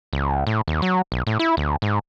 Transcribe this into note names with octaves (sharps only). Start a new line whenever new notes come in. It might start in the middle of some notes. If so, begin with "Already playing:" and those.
C#2
A2
D#2
F#3
B1
A2
E4
D2
G#2